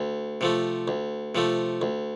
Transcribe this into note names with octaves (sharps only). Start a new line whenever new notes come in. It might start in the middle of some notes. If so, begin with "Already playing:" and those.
Already playing: D2
C3 F3 A3
D2
C3 F3 A3
D2